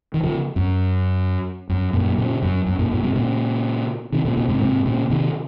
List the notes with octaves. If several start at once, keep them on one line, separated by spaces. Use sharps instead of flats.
D#3
C#3 F3
F#2
F#2
F#2 A#2
A#2 C#3
F#2
F#2
F#2 A#2
F#2 A#2
G#2 C3
A#2 C#3
C3 D#3
A#2 C#3
A#2 C#3
G#2 C3
G#2 C3
A#2 C#3
C3 D#3